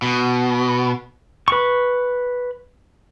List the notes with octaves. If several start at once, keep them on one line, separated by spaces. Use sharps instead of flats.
B2
B4 C#6